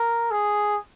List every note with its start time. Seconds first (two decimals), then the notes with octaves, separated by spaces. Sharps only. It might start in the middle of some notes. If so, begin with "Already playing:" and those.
Already playing: A#4
0.31 G#4